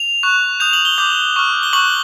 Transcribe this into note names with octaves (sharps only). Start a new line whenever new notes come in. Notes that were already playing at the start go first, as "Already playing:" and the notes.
Already playing: F7
C#6 F#6
D#6 G6 F7
F#7
G7
D6 G6
C#6 F6
G7
C#6 F#6 F#7